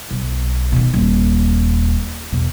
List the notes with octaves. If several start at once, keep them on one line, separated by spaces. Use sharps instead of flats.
B1
B2 D#3
D#1
E2 B2